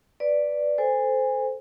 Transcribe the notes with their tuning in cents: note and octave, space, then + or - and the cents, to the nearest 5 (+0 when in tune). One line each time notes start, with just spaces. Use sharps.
B4 +0 D5 +0
A4 +0 C5 -15 G#5 -25